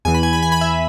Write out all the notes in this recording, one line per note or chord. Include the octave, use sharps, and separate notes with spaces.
E2 E3 G#5
B5
G#5
B5
G#5
B5
E5 G#5